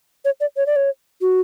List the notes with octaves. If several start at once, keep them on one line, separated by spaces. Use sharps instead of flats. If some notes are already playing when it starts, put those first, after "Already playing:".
C#5
D5
C#5
D5
C#5
F#4